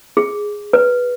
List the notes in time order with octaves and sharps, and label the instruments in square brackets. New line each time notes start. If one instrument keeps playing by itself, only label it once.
[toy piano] G#4
B4